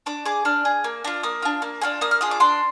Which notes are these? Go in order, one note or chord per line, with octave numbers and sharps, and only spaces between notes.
D4 D6
G#4 D6
D4 F6
G#4
A#3
D4 F4
A#3 D#6
D4 F4
A#3
D4 F4 G#4
A#3 D#6
F6
D4 F4 G#4 D#6
D6
D4 C6